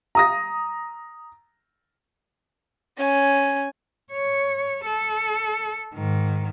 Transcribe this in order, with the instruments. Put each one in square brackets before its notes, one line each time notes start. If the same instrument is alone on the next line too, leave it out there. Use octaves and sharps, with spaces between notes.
[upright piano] A#5 D#6 A#6
[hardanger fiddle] C#4 G#5
[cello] C#5
A4
G#2 D#3